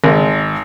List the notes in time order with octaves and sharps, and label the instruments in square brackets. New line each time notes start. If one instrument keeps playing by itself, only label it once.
[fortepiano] G#1